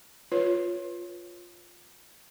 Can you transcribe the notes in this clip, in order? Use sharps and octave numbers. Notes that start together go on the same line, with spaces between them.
F4 B4 C#5